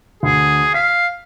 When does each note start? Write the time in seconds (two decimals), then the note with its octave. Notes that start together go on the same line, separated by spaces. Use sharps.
0.23 D2 G#4
0.74 F5 B6